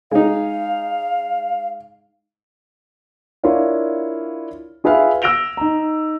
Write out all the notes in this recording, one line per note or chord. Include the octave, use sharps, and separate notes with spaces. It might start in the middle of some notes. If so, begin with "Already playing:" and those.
G#3 D#4 F5
D4 E4 F4 A#4 C#5 F5
F4 G#4 B4 E5 F5
E6 A#6 D7 F7 G7
D#4 A#5